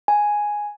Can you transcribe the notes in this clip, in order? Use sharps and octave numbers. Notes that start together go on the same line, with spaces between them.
G#5